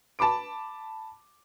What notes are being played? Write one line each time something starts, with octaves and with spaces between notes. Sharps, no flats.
A5 B5 D6 D7